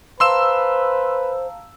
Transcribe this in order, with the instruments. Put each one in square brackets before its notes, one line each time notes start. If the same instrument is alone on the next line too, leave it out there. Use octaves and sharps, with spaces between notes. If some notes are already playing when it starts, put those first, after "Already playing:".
[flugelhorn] B4 [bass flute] C5 [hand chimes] F5 A5 A#5 [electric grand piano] C6 E6 E7